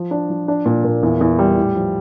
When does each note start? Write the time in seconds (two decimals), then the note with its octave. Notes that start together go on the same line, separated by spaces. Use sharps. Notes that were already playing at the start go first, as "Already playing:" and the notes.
Already playing: F3
0.11 D4
0.30 F3
0.48 D4
0.65 A#2
0.84 A#2
1.03 E2
1.21 E2
1.39 G3
1.57 A2
1.76 F3